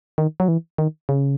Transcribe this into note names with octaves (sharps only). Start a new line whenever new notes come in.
D#3
F#3
E3
D#3
C#3